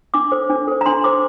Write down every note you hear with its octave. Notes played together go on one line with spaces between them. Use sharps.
D4 D6
A4 C5
D4
A4 C5
A#5
D4 C6
A4 C5 D6